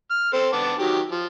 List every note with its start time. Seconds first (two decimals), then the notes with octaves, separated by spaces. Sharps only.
0.10 F6
0.33 C4 A4 C5
0.53 B3 A5 D6
0.79 D#3 F#3 G4
1.12 F3